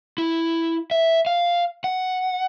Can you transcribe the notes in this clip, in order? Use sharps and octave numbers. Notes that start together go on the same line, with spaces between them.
E4
E5
F5
F#5